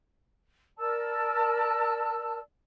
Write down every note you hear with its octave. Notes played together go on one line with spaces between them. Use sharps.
A#4 D5 A5 E6